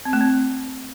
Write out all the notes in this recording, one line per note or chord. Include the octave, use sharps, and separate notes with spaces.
C4
A3
C4